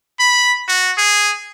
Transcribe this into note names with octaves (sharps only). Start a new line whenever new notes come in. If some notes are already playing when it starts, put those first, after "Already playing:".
B5
F#4
G#4